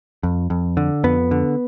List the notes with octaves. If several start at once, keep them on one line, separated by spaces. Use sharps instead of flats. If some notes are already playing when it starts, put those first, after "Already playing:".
F2
F2
D3
F2 B3
D3